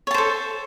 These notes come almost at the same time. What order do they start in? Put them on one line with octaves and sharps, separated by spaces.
C#5 A5 C5 A4